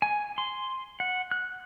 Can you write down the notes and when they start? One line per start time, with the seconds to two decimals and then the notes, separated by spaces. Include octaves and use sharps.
0.02 G#5
0.38 C6
1.00 F#5
1.31 F#6